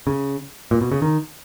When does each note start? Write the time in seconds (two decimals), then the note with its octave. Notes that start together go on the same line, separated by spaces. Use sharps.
0.07 C#3
0.71 A#2
0.81 B2
0.92 C#3
1.02 D#3